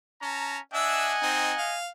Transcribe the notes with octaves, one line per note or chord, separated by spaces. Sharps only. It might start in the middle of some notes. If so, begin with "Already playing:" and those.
C#4 A5 A#5
D4 D#5 E5 F#5 G#5 E6
C4 D#4
F5